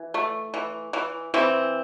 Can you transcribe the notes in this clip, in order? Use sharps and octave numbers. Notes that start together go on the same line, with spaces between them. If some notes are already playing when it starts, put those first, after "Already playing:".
Already playing: E3
A3
E3
E3
E3 C4